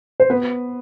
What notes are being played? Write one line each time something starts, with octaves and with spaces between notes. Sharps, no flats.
C5
B3 B4